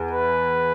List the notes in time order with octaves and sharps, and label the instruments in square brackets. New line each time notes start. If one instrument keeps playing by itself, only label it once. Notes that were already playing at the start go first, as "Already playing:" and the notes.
Already playing: [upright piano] E2
[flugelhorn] B4